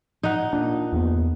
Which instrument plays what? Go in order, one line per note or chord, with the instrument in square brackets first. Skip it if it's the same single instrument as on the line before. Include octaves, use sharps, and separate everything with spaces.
[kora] D#4 F#5
[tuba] A#2 [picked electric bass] D4
[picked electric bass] E2 A3 B3